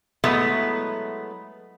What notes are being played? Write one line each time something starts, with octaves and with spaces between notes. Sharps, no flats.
F#3 G#3 A3 B3 E4